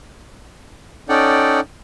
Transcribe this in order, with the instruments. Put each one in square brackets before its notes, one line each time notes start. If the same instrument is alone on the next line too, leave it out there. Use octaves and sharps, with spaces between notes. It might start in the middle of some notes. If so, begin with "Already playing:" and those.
[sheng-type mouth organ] C#4 D#4 A4 D5 F#5 G5